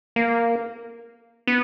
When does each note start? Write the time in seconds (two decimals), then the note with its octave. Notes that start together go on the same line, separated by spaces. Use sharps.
0.16 A#3
1.47 B3